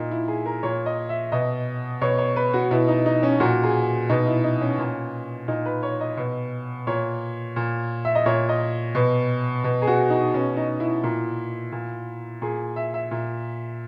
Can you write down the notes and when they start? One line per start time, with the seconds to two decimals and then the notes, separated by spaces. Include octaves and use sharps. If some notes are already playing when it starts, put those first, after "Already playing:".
Already playing: A#2 D#4
0.11 E4
0.28 G#4
0.46 A#4
0.63 A#2 C#5
0.86 D#5
1.09 E5
1.32 B2 D#5
2.01 B2 C#5
2.18 C#5
2.36 B4
2.54 F#4
2.71 B2 E4
2.88 D#4
3.06 D#4
3.23 C#4
3.40 A#2 F#4
3.63 G#4
4.09 B2 D#4
4.27 E4
4.44 D#4
4.61 C#4
4.79 A#2
5.48 A#2 D#4
5.66 B4
5.83 C#5
6.01 D#5
6.17 B2
6.87 A#2 C#5
7.56 A#2
8.05 E5
8.15 D#5
8.26 A#2 C#5
8.49 D#5
8.95 B2
9.64 B2
9.82 G#4
9.87 F#4
10.10 D#4
10.34 B2 C#4
10.57 D#4
10.80 E4
11.03 A#2
11.72 A#2
12.42 A#2 G#4
12.76 E5
12.94 E5
13.11 A#2